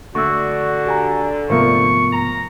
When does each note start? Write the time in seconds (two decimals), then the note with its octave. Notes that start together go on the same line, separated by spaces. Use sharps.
0.15 D3 A3 F#4 C#6 E6
0.87 G4 G#5 A#5
1.50 G#2 C3 F3 A3 B3 A#4 C#6
2.12 A#5